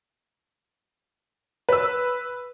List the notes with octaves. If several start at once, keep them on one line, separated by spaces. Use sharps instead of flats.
B4 E6